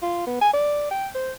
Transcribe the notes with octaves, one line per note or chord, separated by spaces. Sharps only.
F4
B3
G#5
D5
G5
C5